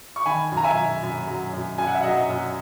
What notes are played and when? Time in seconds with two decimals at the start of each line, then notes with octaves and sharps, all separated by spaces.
0.16 C#6
0.26 D#3 G#5 B5
0.52 F#2
0.57 A#5
0.64 E5 G#5
0.77 F#2
1.03 F#2
1.27 F#3
1.53 F#2
1.78 F#2 G#5
1.87 F#5
1.95 E5
2.03 F#3 D#5 F#5
2.29 F#2